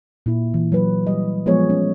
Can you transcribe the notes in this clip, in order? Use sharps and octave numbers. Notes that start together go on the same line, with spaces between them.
A#2 E4
E3
F#3 B4
G3 D#5
F3 G#3 B3 G#4 C#5
C#4